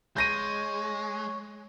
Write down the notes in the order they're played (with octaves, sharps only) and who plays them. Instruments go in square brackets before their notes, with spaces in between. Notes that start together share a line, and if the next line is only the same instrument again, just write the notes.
[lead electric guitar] G#3 [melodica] C#5 [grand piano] G6 A#6 D#7